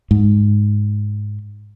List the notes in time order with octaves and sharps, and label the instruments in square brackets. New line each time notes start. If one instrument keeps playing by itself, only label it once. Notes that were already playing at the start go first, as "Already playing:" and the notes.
[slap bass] G#2